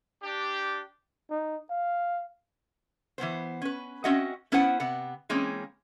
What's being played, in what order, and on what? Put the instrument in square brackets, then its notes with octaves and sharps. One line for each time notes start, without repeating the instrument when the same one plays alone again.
[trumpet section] D4 G4
[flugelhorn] D#4
F5
[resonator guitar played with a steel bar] E3 F#3 B3 C5
C#4 B4
C4 C#4 F#4 D#5 E5 F#5
B3 C#4 E4 B4 C5 F#5
C3 B3 F#5
E3 G#3 A#3 C4 C#4